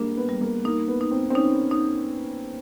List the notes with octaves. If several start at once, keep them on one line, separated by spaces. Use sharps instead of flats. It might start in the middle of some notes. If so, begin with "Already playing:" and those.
Already playing: G3 G#3 A#3 D4
B3
G3
A#3
A#3 D#4
B3
D#4
C4
C4
C#4 D#4
D#4